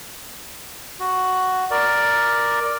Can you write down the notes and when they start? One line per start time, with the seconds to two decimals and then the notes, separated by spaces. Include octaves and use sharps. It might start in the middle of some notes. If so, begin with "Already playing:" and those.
1.00 F#4
1.71 A#4 D5